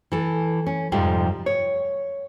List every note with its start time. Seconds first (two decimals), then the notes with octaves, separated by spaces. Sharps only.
0.12 E3 A4
0.67 C#4
0.92 F2 G#2 C3 F3 G3
1.46 C#5